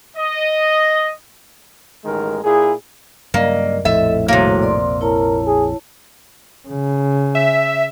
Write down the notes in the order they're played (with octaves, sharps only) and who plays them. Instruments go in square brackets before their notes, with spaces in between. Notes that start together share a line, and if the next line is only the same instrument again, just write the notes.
[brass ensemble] D#5
[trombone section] A1 D#3 G#3 A#4
A#2 E4 G#4
[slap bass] G2 C#3 F#3 [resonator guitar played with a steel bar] A#3 [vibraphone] A#4 D5 D#5
[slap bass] A#1 F2 F3 [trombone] A2 [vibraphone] A4 D#5 [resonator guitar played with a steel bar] E5
[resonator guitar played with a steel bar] C3 A#3 [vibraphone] G3 F#4 C#5
[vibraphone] D5 C6
[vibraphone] E4 C#5 A5 [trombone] A#4
[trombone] G#4
[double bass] C#3
[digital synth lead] E5